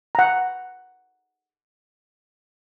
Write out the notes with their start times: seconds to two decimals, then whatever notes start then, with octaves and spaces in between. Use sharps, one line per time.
0.15 F#5 A#5